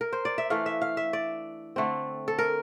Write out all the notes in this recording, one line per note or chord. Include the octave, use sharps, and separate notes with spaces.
A#4
C5
D5
E5
E3 A3 D4 F5
E5
F5
E5
D5
D3 A3 C4
A4
A#4